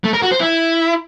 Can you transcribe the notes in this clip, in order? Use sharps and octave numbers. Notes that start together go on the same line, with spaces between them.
A3
A#4
F#4
C5
E4